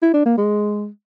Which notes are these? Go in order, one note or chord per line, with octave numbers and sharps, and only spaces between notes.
E4
D4
A#3
G#3